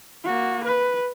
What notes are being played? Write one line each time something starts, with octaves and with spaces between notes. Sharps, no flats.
A#3 F#4
B4